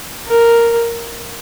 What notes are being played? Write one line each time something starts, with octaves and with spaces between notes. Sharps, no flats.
A#4